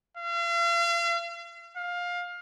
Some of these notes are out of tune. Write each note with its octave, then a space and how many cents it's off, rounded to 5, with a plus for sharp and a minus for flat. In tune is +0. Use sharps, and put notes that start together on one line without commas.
F5 -40
F5 +20